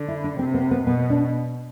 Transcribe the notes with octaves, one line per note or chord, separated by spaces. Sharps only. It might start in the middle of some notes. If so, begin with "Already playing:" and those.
Already playing: D3
E4
D4
C3 C4
B3
B3
B2 B3
D4